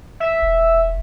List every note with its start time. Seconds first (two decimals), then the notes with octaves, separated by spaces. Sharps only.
0.20 E5
0.42 E1